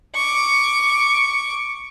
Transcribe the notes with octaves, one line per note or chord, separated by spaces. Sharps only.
C#6 D6